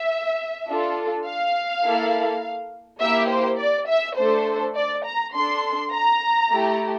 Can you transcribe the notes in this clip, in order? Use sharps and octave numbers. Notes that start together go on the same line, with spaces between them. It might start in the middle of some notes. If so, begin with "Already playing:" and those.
Already playing: E5
D4 F4 A4
F5
A#3 E4 A4
A#3 E4 G4 E5
C5
D5
E5
A3 D4 A4 C5
D5
A#5
D4 A4 C6
A#5
A3 E4 G4